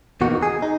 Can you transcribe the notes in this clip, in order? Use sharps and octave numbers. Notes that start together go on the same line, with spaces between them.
E2 B2 A#3 D#4 F#4
G#4
D#4